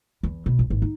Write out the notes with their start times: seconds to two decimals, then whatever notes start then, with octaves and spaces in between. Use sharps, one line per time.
0.23 E2
0.46 B2
0.59 A#1
0.70 G#1
0.82 D#4